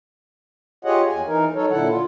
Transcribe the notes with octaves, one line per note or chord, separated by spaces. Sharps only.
F4 G4 G#4 C#5 D#5 F#5
E2 G#5
E3 D#4 A#4
F#3 D#4 A4 C#5
A#2 D3 E4 A4 F#5
F4